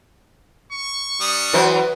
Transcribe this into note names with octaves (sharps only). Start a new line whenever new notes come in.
C#6
G3 D4 D#6
E3 F#3 B4 C5